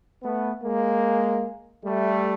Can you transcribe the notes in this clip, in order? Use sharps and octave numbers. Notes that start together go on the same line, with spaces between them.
A3 B3
G#3 A#3
G3 A3